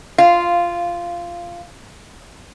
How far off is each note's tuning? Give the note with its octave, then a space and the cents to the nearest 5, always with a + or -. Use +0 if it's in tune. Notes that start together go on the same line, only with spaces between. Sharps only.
F4 -10 F5 +0